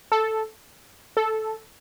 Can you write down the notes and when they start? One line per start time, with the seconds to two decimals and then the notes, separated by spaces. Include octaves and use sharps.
0.12 A4
1.17 A4